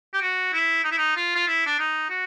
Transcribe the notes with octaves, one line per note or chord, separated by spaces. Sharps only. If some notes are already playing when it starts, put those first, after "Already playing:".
G4
F#4
E4
D#4
E4
D#4
F4
F4
E4
D4
D#4
F#4